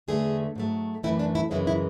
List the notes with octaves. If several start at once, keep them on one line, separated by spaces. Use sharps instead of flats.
E2 D3 A3 G#4
G#2 F#3 A3
F#2 E3 A3 E4
D4
E4
F#2 C#3 E3 G#3 E4
E4